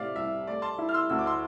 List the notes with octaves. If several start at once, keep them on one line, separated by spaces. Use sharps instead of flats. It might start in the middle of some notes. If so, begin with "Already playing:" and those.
Already playing: A2 C3 D5 E5 F5
C2 E5
A3 D5
A5 C6
E4
F6
C6 E6
D2 E6
D6
C6 E6